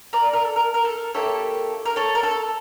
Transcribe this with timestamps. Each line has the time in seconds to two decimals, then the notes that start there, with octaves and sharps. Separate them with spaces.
0.13 A#4 D5
0.33 A#4
0.45 A4
0.56 A#4
0.74 A#4
0.85 A4
0.96 A#4
1.14 A#3 E4 G4 A4 C#5
1.85 A#4
1.96 A4 C#5
2.15 A#4
2.23 A4